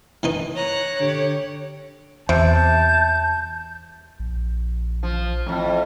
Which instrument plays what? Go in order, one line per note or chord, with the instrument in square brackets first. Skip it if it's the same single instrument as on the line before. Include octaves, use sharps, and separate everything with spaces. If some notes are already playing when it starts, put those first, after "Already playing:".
[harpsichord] D#3 E3 D#4
[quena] C#5 [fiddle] A#5 F#6
[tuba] D3 [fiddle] G4
[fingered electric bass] E2 [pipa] C3 [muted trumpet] A5 [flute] G6
[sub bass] A#1
[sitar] F3
F2 A2